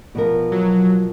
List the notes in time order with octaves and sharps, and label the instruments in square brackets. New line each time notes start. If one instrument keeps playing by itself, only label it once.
[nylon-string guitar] B2 F3 A#4
[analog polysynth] F#3